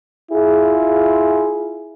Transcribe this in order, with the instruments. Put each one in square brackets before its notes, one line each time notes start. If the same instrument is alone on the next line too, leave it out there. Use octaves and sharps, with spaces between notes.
[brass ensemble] E4 F4 G#4